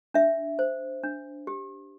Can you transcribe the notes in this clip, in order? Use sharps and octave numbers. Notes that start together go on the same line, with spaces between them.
D4 E5
C5
D4
G4